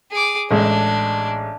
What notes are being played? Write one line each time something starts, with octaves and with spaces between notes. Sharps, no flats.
G#4 D6
A1 G#3 D4